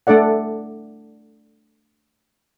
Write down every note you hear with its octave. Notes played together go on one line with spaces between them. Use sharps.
A3 D4 A4 D5 F#5